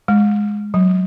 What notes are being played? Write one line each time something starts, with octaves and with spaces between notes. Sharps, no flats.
G#3
F#3